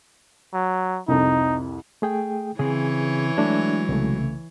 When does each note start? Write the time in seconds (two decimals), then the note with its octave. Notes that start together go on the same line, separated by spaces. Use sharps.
0.54 F#3
1.08 C2 F2 D#4
2.02 A3 G#4 G5
2.59 C#3 E3 C4 G#4 C#5
3.38 F#3 G#3 A3 D4 E4
3.89 C2 C#3 A3